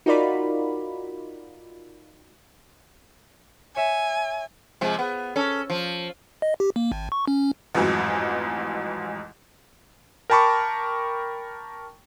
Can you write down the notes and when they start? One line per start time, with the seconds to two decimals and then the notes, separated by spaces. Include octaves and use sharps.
0.06 D#4 F4 F#4 A#4 D5 B5
3.76 C#5 E5 G#5
4.81 C3 F3 G#3
4.99 B3
5.36 C#4 A4
5.70 F3
6.42 D#5
6.60 G4
6.76 A#3
6.92 G#1
7.12 C#6
7.28 C#4
7.75 A1 F2 G#2 E3 F#3
10.30 A#4 G5 A5 B5 C#6 D6